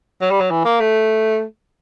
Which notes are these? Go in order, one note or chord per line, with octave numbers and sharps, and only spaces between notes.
F#3
G3
F#3
E3
A#3
A3